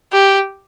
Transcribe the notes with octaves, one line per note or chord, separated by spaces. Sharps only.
G4